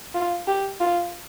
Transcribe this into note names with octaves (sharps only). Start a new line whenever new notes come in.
F4
G4
F4